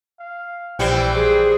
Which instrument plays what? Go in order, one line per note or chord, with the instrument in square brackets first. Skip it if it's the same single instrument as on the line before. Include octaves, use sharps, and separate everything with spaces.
[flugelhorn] F5
[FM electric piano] A#1 C7 [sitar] E3 G3 C4 [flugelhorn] G5
[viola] G#4 [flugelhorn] C5